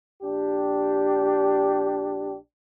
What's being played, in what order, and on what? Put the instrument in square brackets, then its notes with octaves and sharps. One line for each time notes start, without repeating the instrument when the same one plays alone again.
[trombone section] A#1 D4 G4